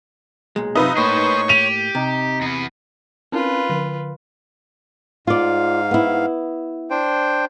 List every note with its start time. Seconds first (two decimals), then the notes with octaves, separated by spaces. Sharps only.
0.56 B1 A#2 G#3
0.75 F#2 C3 D#4 F4 B4 E5 D#6
0.97 A2 A#3 G#4 C5 C#5 C#6
1.49 G4 D#7 F7
1.95 C3 D#4
2.41 E2 B3
3.32 C4 C#4 F4 A#4 B4
3.70 D3
5.27 G#2 F4 D5 F5
5.91 B3 E4
6.90 D4 C5 G5